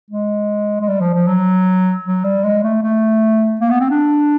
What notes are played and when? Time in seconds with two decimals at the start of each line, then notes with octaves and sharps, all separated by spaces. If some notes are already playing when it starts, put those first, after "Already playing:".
0.11 G#3
0.81 G#3
0.88 G3
1.01 F3
1.14 F3
1.28 F#3
2.05 F#3
2.24 G3
2.44 G#3
2.63 A3
2.83 A3
3.61 A#3
3.71 B3
3.80 C4
3.90 D4